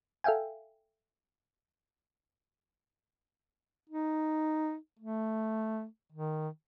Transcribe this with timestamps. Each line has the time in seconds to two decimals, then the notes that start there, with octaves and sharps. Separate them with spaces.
0.24 A4 E5 F5 G5 G#5
3.90 D#4
4.99 A3
6.13 D#3